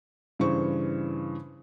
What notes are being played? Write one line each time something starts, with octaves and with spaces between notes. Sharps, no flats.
G2 C#3 E3 C5 C#6